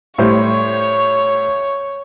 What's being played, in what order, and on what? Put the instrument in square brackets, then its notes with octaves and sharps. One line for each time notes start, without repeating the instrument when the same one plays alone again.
[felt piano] A2 G3 C5 [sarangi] C#5